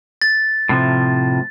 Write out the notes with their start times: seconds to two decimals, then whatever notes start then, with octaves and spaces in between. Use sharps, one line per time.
0.22 A6
0.69 A2 C3 F3